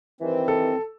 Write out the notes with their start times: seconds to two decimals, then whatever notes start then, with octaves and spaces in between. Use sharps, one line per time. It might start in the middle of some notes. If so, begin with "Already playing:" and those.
0.21 G2 D#3 E3 C4
0.48 A4